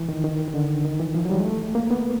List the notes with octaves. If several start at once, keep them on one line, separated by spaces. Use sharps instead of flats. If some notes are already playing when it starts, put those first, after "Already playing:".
Already playing: E3
D#3
D#3
D#3
D3
D#3
E3
F3
F#3
G3
G#3
A3
A#3
B3